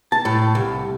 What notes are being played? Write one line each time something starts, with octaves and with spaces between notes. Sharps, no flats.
A5
A2
C2